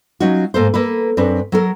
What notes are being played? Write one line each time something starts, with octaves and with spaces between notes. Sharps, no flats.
F#3 C#4 D#4 F4 F#4
G#2 A#3 A4 C5
A#3 A4 B4
F#2 C4 D4 B4
F#3 A4 A#4